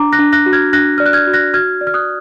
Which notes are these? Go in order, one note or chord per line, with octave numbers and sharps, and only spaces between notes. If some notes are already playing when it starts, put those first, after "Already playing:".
Already playing: D4 A#5 D6
F#6 A#6
D4
F#6 A#6
F#4
F6 G#6
D4 F#6 A#6
D5 F6
F#6
F6 G#6
F#4
F#6 A#6
F#4 F6 G#6
D5
F6
D#6 F#6